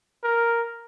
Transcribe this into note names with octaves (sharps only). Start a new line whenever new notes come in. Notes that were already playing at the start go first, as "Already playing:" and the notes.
A#4